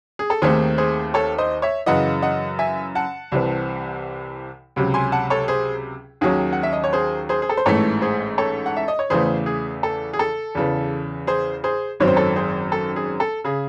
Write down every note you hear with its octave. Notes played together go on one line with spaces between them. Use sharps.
G#4
A4
D#2 D#3 A3 C4 G#4 C5
G#4 C5
A4 C#5
C5 D#5
C#5 E5
F#2 C#3 E3 D#5 F#5
D#5 F#5
E5 G#5
F#5 A5
C2 C3 E3 C4
C#2 C3 F#3
G#5 C6
F#5 A5
A4 C#5
G#4 C5
D#2 D#3 F#3 C#4 G#4
F#5
E5
D#5
C#5
G#4 C5
G#4 C5
G#4
A4
C5
A1 G#2 E3 A3 A4 C#5
G#4 C5
A4 C#5
F#5
E5
D#5
C#5
E2 C#3 E3 A3 G#4 C5
G#4
A4
G#4
A4
E2 C#3 E3
G#4 C5
G#4 C5
G#1 F#2 D#3 F#3 C4 C#5
C5
A4 C#5
G#4 C5
A4
G#4
A4
C#3 G#4